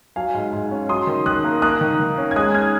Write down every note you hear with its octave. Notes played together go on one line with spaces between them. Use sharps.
F#3 F5 G#5
G#2
G#2
C#4
F#3 C6 D#6
D#3
D#3 D#6 F#6
A#3
A#3 D#6 F#6
D#3
D#3
C#4
G#6
G#3 D#6 F#6
D#4 F6 G#6